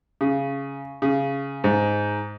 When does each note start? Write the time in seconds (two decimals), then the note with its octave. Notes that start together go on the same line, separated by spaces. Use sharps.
0.21 C#3
1.02 C#3
1.64 G#2